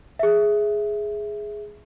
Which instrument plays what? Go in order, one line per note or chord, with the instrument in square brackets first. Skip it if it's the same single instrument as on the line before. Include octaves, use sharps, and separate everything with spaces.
[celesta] G#4 E5